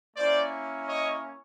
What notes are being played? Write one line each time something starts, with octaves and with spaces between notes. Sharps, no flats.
A#3 C#4 E4 C5 D5
C#5 D#5